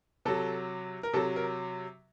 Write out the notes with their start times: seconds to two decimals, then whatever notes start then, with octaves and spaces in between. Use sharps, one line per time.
0.25 C3 F#3 A4
1.03 A#4
1.13 C3 F#3 A4
1.36 A#4